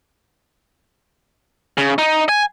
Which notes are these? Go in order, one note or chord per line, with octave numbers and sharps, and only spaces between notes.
C#3
D#4
G#5